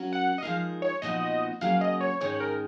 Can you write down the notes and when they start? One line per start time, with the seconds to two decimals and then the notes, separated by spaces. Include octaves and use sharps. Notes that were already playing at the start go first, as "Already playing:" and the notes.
Already playing: F#3 C#4 F#4 A#4
0.13 F#5
0.38 D#5
0.43 F3 G#3 D#4 A#4 F5
0.82 C#5
1.02 A#2 F3 B3 D#4 F#4 D#5
1.61 C#3 F#3 A#3 F5
1.81 D#5
2.01 C#5
2.21 G#2 D#3 G#3 C#4 C#5
2.40 A#4